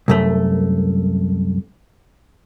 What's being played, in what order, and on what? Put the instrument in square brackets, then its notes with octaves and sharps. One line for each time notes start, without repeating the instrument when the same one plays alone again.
[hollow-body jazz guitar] C2 F#2 A3